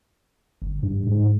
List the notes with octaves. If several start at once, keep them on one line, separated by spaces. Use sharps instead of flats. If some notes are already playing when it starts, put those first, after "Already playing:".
G1
G2
G#2